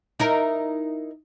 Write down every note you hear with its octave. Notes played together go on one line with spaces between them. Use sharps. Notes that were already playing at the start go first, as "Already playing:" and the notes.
D#4 E4 A#4